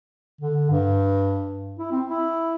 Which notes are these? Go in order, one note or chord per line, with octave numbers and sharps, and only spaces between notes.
D3
G2
E4
C4
E4